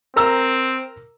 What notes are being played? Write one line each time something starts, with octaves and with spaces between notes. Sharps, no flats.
C4 A#4 A#5 E6